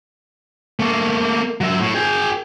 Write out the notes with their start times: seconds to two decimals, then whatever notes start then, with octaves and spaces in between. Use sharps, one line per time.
0.80 A3 A#3
1.61 F#3 E5
1.79 A2
1.95 G#4 G5